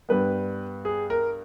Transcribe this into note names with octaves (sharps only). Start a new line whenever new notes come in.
G2 G3 B3 B4
G#4
A#4